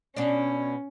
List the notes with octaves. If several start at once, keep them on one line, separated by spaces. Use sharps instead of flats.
B2 C#4 D4